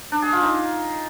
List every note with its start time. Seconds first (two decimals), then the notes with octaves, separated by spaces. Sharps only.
0.12 D4
0.22 G#4
0.32 F4
0.43 D#4